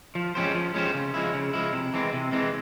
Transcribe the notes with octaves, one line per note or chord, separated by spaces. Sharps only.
F3
G#3 C#4 G4 C5
F3
G#3 C#4 G4 C5
C#3
F3 G#3 E4
C#3
F3 G#3 E4
C3
E3 G#3 C4
C3
E3 G#3 C4